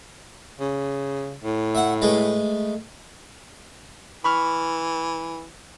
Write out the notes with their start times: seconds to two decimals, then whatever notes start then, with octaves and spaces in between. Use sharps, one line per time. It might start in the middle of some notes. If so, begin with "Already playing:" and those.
0.60 C#3
1.44 A2
1.75 E5 F#5
2.02 G#3 A3 B4
4.24 E3 B5 C#6 F6